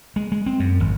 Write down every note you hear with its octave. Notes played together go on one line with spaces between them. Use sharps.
G#3
G#3
C4
F#2
G#1